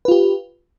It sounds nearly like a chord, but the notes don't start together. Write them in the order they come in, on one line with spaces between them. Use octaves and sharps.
B4 F4 G4